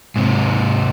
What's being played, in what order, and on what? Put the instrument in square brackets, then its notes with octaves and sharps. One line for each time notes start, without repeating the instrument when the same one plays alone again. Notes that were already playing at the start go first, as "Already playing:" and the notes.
[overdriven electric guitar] G#2 C3